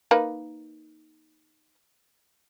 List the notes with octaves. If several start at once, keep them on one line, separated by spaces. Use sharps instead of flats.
A#3 D#4 B4